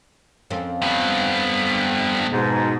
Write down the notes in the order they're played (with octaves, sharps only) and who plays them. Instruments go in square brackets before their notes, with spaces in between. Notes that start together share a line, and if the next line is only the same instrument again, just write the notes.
[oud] F2 C4 C#4
[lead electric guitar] G2 B3
[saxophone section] G#2 B2